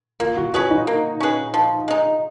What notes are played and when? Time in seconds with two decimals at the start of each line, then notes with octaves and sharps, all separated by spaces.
0.20 A#3 F4
0.37 F#4
0.53 C#4 F#4 G#4 B4
0.70 D#4
0.87 A#3
1.20 C#4 G#4 B4
1.54 F3
1.88 G#3 D#4